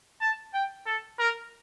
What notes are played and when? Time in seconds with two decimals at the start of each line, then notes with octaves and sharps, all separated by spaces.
0.21 A5
0.54 G5
0.86 A4
1.19 A#4